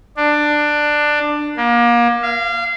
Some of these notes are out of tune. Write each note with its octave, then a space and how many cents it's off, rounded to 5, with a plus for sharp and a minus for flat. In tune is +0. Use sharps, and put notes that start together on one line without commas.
D4 +15
A#3 +30
F5 -25